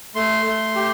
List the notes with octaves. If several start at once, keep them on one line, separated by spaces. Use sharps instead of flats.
A3 C6
A3
G4